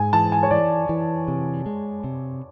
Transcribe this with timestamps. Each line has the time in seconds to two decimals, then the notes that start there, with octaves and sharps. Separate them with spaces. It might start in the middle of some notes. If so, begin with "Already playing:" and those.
Already playing: G#2 G#5
0.13 E3 A5
0.32 G#5
0.43 C#5
0.51 E3 D5
0.89 E3
1.28 C3
1.66 G#3
2.04 C3